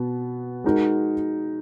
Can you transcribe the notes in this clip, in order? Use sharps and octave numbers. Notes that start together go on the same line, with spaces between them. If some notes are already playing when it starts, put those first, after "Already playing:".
Already playing: B2 B3
G#3 D#4 F#4 A#4